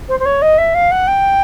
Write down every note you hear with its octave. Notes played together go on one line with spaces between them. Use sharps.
C5
C5
C#5
D#5
E5
F5
F#5
G5